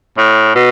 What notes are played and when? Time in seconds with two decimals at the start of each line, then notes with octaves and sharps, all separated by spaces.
0.18 A2
0.55 B2